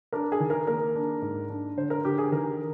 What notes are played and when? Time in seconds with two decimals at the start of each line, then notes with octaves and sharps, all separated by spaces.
0.13 D4 A#4
0.32 G#4
0.40 D#3
0.50 A#4
0.67 A#3 A#4
0.95 D4
1.22 G#2
1.49 D4
1.77 D3 C5
1.90 A#4
2.05 D3 G4
2.18 G#4
2.32 D#3 A#4